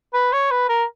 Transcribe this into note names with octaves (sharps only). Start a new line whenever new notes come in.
B4
C#5
B4
A#4